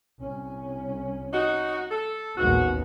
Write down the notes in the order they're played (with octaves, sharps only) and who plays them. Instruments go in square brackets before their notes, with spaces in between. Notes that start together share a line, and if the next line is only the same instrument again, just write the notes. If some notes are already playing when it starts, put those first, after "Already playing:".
[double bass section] C2 C#4
[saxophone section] D#4 F#4
A4
[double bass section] A1 D#2 B3 [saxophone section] G#2 F#4